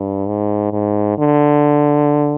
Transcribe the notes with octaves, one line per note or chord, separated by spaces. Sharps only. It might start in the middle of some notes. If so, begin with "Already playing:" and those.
Already playing: G2
G#2
G#2
D3